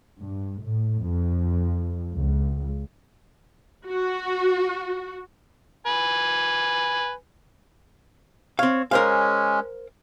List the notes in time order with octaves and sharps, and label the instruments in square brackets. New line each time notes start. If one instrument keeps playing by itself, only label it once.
[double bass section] G2
A2
F2
C#2
[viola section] F#4
[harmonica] B4 G#5
[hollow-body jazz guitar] C4 F5 [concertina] C#5
[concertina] G#3 C#4 [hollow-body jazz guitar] A#4 C5 F5